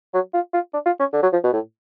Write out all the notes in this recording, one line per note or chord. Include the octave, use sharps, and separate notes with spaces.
F#3
F4
F4
D4
F4
C#4
D3
F#3
F3
B2
A2